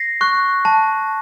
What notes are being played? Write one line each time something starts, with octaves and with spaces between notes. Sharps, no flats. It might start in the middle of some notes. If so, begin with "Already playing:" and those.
Already playing: A#6 C7
C#6 F#6
A5